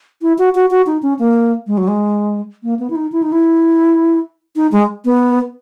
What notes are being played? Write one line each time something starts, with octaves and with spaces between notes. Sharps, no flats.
E4
F#4
F#4
F#4
D#4
C#4
A#3
G#3
F#3
G#3
A#3
B3
E4
D#4
E4
D#4
E4
D#4
G#3
B3